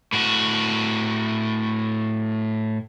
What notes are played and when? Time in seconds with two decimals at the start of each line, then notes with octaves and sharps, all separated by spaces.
0.13 A2 F#4